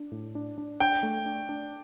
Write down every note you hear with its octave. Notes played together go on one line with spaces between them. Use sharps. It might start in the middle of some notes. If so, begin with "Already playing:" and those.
Already playing: D4
A2
D4
D4
D4 G5
A3
D4
D4